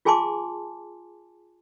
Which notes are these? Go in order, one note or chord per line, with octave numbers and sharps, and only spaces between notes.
F4 G#4 G#5 A5 C6 D6